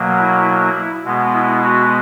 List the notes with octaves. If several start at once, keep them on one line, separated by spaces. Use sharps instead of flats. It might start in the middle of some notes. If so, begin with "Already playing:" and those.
Already playing: B2 F#3 A#3
E4
E4
B2 G#3 B3
E4
F#4